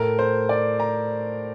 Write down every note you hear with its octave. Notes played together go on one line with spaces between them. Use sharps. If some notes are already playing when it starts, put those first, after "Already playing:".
Already playing: A2 A3 A#4
C5
D5
A#5